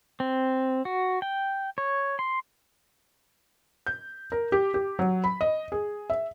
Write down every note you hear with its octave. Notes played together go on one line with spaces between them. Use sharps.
C4
F#4
G5
C#5
C6
G6
A#4
G4
G4
F#3
B5
D#5
G#4
E5